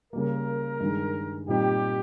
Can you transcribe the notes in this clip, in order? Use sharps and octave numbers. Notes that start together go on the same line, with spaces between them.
C#3 G3 A#3 A#4
G2 D#3 G#3
A#2 G3 C4 D#4 G4